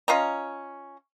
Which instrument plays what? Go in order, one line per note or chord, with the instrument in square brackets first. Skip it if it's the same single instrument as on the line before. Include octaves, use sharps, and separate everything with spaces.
[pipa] C#4 F4 D#5 A#5